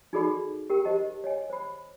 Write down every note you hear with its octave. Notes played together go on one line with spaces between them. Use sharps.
D#4 F#4 G#4 A4 D5 B5
G4 A#4 G5
G4 C5 D#5 A5
C#5 D#5 G#5
C5 B5